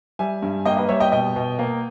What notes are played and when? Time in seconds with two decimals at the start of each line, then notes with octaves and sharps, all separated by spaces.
0.19 G3 E5 G#5
0.42 G2
0.65 A#3 D#5 G5
0.77 B4 D#5
0.89 G3 C#5 E5
1.00 D#5 G5
1.12 B2 D#5 G5
1.36 B2
1.59 A#3